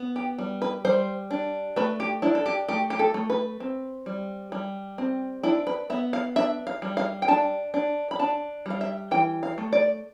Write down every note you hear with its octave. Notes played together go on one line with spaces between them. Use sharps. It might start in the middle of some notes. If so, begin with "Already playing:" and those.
Already playing: B3
G4
G3
B4
G3 C5
D4
A3 B4
G4
D4 E4
A4
G4
A3 G4
G4
A4
A3
B4
C4
G3
G3
C4
D4 E4
B4
B3 E5
F5
D4 E5
F5
G3
F5
G5
D4 A5
D4
B5
D4 A5
G3 F5
E5
E3 G5
F5
A3
D5